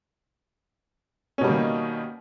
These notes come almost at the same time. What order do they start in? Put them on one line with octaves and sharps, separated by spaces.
C#4 B2 G3 A#3 D#3